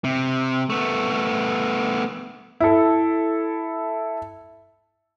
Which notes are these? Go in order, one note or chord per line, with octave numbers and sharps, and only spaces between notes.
C3
A3 B3
E4 A4